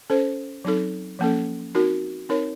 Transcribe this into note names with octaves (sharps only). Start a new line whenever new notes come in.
C#4 A4 C5
F#3 C4 D#4 A4
F3 A#3 C#4 A4
C4 D#4 F#4 A#4
C4 D#4 A#4 C#5